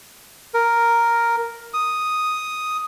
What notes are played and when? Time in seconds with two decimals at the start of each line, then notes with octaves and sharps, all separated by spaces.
0.54 A#4
1.74 D#6